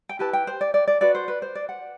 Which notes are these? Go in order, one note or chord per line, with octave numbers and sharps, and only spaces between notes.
G5
E4 G4 B4 A5
G5
C5
D5
D5
D5
F#4 B4 D5
C5
B4
C5
D5
F#5